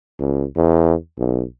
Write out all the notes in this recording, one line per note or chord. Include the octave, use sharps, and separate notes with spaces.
C#2
E2
B1